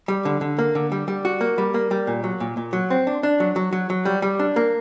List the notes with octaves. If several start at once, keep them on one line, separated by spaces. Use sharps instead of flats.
G3
D3
D3
A#3
D3
G3
G3
F#4
A#3
G3
A#3
G3
A#2
F#3
A#2
A#2
F#3
C4
D4
D4
F#3
F#3
F#3
F#3
G3
G3
D4
A#3